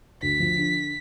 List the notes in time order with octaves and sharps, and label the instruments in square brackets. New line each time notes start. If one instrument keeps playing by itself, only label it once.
[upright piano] D2 [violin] B6
[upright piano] F3
D3